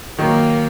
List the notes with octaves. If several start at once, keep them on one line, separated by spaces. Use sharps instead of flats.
D#3 F#3 A#3